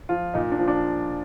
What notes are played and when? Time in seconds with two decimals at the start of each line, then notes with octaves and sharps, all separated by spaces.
0.09 F3 F4
0.34 A#2 D#4
0.52 D4
0.59 F3
0.68 D4